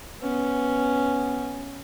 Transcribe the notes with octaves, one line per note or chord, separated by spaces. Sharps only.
B3 C#4